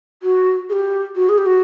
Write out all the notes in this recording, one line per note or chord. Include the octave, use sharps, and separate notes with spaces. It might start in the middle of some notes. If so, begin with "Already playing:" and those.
F#4
G#4
G4
F#4
G#4
G4
F#4